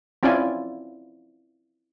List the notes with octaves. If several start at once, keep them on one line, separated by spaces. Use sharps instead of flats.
C4 C#4 E4 F4 D5 G#5